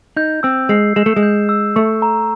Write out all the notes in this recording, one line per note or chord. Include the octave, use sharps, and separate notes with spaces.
D#4 G6
C4 E6
G#3 C7
G#3 E7
A3
G#3
G6
E6
A3 C#6
A#5